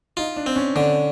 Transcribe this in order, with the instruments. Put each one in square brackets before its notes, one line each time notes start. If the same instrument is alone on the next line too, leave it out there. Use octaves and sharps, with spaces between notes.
[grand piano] D#4 [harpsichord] F4
[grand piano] D4
[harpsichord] C4
[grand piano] C#4
[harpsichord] D3 [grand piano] C#4